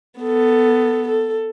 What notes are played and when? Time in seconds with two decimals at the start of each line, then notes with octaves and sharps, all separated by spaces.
0.20 B3 A4
1.08 A4